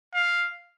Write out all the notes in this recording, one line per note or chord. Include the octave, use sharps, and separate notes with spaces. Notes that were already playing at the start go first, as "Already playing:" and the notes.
F5